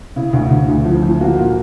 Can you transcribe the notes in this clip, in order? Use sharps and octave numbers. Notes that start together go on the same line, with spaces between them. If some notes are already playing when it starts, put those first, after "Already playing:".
C#3 E4
D2
D2
D2
F3
F3
A#3 F#4
A#2